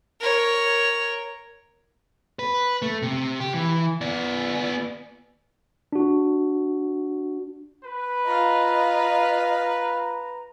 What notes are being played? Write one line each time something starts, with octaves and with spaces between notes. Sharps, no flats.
A#4 C#5
B4
A3
C3
G4
E3
B3 D5
D4 F#4
B4
F4 D#5 F5 A#5